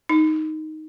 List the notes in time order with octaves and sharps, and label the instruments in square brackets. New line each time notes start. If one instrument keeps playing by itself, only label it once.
[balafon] D#4